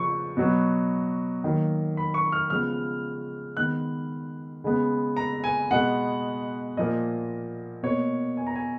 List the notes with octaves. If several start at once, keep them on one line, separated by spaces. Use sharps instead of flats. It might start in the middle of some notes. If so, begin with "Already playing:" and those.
Already playing: C#3 F3 C#6
B2 F#3 B3
D#3 F#3 A#3
B5
C#6
F6
C#3 F3 G#3 B3 F6
D#3 G#3 B3 F#6
C#3 G#3 B3
A#5
G#5
B2 G#3 B3 F#5
A#2 F3 A#3 D#5
B2 A#3 C#5
G#5
A#5
G#5